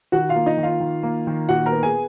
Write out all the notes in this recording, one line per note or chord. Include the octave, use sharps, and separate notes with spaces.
D#3 F#4 F#5
F4 F5
A#3
D#4 D#5
D#3
F4 F5
D#3
A#3
D#3
A#2 F#4 F#5
A#4 A#5
B3
G#4 G#5